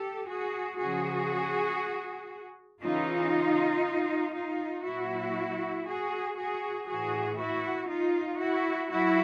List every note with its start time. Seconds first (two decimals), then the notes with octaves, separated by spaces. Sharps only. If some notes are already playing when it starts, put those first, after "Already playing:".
Already playing: G4 A4
0.28 F#4 G#4
0.79 C#3 F3 F#4 G#4
2.82 C#3 E3 D#4 F4
4.34 D#4 F4
4.85 A#2 F#3 E4 F#4
5.86 F#4 G#4
6.37 F#4 G#4
6.87 A2 E3 F#4 G#4
7.38 E4 F#4
7.89 D#4 F4
8.40 E4 F#4
8.90 F#3 E4 F#4